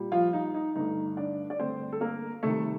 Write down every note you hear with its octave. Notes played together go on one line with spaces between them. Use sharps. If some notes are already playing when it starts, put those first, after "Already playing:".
Already playing: A#2 G3
F3 F4
D#4
D#4
G2 D3 A3 D#4
D4 D5
D5
G2 D3 A3 C4 C5
A4
A#3 A#4
C3 D#3 G3 A3 A4